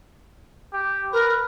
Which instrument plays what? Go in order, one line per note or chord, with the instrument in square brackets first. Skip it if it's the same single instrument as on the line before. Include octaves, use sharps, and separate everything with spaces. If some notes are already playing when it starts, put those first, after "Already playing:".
[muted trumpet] G4
[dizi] A#4 [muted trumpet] B4